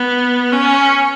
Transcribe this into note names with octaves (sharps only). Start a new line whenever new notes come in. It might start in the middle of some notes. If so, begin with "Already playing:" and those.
Already playing: B3
C#4